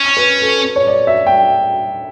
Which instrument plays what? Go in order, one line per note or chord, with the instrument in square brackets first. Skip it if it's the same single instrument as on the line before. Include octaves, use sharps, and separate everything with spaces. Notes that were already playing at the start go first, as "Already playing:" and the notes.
Already playing: [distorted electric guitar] C#4
[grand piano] B4
A4
C#5
D5
E5
G5